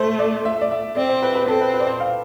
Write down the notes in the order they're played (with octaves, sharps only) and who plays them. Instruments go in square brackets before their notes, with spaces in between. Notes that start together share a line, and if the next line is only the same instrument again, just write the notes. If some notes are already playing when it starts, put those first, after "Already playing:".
Already playing: [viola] A3 [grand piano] C5
[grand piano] D5
E5
D5
E5
[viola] C4 [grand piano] D5
[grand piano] C5
B4
B4
[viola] C4 [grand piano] A4
[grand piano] B4
B4
D5
C5
F5